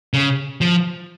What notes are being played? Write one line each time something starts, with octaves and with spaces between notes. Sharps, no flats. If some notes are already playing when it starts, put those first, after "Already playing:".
C#3
F3